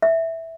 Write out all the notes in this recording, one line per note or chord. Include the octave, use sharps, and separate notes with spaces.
E5